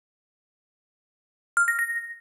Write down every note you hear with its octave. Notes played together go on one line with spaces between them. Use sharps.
F6
A#6
A#6